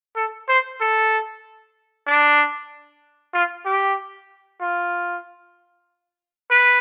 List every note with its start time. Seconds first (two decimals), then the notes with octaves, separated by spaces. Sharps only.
0.16 A4
0.49 C5
0.81 A4
2.07 D4
3.33 F4
3.66 G4
4.61 F4
6.51 B4